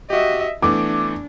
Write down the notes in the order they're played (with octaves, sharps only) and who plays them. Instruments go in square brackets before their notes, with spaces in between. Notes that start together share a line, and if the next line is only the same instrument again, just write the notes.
[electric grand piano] F#4 G4 [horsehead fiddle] D#5 E5
[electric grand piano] E3 A3 B3 [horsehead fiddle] D4 [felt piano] D6